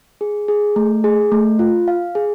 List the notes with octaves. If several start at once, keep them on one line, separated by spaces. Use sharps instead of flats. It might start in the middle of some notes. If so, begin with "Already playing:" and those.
G#4
G#4
A3
G#4
A3
F4
F5
G#4